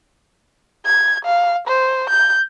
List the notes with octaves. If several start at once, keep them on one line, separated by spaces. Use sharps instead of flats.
G#6
F5
C5
G6